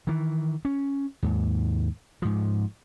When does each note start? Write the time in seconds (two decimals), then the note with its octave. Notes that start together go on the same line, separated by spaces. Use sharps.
0.07 D#3 E3
0.65 C#4
1.23 D#2 G#2
2.22 G#2 F3